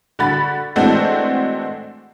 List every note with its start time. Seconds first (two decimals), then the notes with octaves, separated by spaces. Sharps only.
0.19 D3 F#4 B5 A6
0.76 E3 G#3 A3 C4 D4 F#4